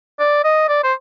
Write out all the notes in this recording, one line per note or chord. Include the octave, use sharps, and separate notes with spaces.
D5
D#5
D5
C5